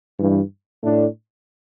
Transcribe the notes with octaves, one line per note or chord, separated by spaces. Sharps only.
G2 E3 G3
A2 A3 D4